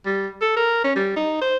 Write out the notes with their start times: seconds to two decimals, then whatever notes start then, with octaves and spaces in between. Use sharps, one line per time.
0.05 G3
0.41 A4
0.56 A#4
0.84 C#4
0.96 G3
1.16 D#4
1.41 C5